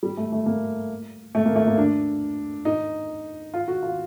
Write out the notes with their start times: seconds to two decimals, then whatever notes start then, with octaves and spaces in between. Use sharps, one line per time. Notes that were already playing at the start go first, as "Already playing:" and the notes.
0.03 G3
0.17 A3
0.32 A3
0.46 A#3
1.35 A3
1.46 A#3
1.56 A3
1.67 A#3
1.77 D4
2.65 D#4
3.54 F4
3.68 F#4
3.83 F4